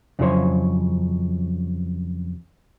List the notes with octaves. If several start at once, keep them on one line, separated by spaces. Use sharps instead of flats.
F2 C#3 F#3 E4 C5 C#5